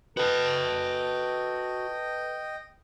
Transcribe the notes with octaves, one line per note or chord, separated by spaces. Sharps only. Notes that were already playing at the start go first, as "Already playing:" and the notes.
F#4 A4 B4 D#5 G5 A5